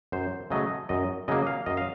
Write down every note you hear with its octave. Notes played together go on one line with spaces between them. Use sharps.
F#2 C5
C#3 F#3 A3 D#5
F#2 D#5
C#3 F#3 A#3 D#5
F5
F#2 D#5
F5